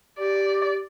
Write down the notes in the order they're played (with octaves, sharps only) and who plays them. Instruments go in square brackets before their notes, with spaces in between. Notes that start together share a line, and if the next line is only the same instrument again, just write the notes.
[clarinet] G4 [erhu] D5